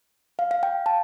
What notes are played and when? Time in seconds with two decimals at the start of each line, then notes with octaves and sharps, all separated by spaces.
0.39 F5
0.51 F5
0.63 G5
0.86 A5